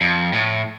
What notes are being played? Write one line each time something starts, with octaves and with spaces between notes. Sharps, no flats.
F2
A2